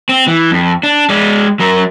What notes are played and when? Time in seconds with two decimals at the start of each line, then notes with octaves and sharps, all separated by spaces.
0.09 C4
0.28 E3
0.51 F2
0.83 D4
1.10 G#3 D5
1.60 F#3 A#4